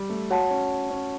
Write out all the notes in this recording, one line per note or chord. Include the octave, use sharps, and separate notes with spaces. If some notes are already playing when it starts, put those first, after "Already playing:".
Already playing: G3
A3
F#4 C#5 F#5 A5
C#4
C#4